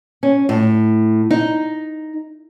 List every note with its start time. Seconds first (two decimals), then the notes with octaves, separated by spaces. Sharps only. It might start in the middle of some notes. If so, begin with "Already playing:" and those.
0.23 C#4
0.49 A2
1.31 D#4